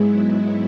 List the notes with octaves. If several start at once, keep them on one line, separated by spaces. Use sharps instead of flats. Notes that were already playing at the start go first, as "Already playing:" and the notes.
Already playing: G#2 F#3 G#3 B3 E4